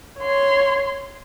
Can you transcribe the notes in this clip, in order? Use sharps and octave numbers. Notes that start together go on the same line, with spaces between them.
C#5 C6